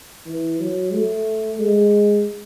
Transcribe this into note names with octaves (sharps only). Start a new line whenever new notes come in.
E3
F#3
A3
G#3